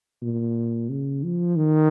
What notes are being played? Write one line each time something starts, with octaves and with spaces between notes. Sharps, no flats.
A#2
C#3
F3
D#3